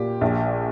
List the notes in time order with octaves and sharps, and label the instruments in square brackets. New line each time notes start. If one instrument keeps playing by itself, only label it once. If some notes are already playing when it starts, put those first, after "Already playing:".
Already playing: [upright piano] A#2 G4
A#1